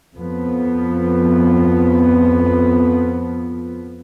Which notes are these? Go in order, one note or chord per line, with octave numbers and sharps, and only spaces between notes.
F2 F3 B3